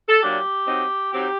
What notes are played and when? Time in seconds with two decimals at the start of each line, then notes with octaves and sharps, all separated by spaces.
0.09 A4
0.23 A#2 F#3 A#3 D4 G4
0.67 F#3 C4 D#4
1.12 F#3 C4 D#4 G4